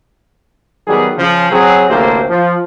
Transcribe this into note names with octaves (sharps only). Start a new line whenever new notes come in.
D#3 F#3 G3 B3 G#4
C#3 F3
F#3 C4 G#4
A1 D2 C3 A3 A#3 C5
F3